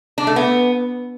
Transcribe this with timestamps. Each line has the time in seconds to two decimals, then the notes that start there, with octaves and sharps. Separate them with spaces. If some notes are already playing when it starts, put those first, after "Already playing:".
0.18 D4
0.27 A3
0.36 B3